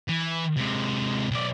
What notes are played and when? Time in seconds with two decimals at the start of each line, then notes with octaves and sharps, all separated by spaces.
0.08 E3
0.57 C3 G#3
1.31 B1 D5